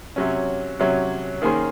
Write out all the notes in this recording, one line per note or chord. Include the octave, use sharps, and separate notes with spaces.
C3 F#3 C#4
C3 F#3 C#4
D#3 A#3 C#4 G#4 C5